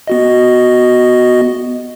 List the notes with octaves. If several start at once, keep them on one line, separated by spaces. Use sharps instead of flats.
B3 F#4 D#5